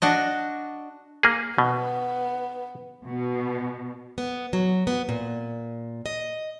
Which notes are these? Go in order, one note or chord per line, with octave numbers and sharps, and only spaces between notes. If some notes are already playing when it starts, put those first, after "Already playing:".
D4 F#4 D#5
A#3 G#4
B2 B3
B2
B3
F#3
B3
A#2
D#5